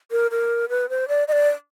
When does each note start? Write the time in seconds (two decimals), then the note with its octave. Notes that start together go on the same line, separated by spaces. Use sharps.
0.11 A#4
0.31 A#4
0.69 B4
0.90 C5
1.08 D5
1.28 D#5
1.32 D5